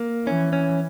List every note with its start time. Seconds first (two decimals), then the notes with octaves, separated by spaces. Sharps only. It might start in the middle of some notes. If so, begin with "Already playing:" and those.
Already playing: A#3
0.26 E3 C#4
0.53 C#4